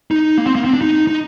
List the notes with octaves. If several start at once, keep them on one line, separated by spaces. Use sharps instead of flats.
D#4
A#3
C4
A#3
C4
D4
D#4
D#4